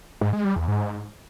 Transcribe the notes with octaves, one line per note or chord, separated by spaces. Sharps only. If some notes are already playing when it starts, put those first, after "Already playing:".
G#2
G#3
G3
E2
G#2